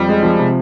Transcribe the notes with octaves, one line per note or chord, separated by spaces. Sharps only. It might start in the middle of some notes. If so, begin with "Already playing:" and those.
Already playing: F2 G3
G#3
F3
C3